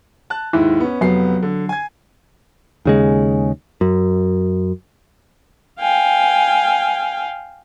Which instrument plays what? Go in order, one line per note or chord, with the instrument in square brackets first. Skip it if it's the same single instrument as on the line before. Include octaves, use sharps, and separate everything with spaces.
[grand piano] A5 F#6
[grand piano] D#2 G#2 [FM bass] E4
[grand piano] B3 C#4
[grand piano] F1 B3 C7 [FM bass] F#3
[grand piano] D3
G#5 G#6
[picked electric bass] D#2 C#3 G#3
F#2
[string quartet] F5 G5 G#5